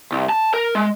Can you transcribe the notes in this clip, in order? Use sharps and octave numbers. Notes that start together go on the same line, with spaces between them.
C2
A5
A#4
G#3